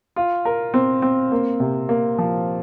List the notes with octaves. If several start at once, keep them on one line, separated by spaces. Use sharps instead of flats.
F4
A#4
C4
C4
A#3
C3
A#3
F3